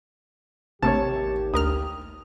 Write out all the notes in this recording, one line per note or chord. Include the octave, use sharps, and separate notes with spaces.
A1 D#2 C3 A3 A#3 G4 C#5 A5
D2 A#4 D#6 F6